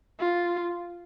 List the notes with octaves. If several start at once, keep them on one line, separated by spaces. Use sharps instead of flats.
F4